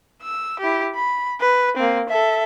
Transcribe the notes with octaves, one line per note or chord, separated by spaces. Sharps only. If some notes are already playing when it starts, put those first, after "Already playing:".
E6
E4 G4
B5
B4
A#3 C4
A4 E5